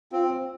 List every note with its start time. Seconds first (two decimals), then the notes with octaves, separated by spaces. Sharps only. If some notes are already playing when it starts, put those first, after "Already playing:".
0.12 C4 F4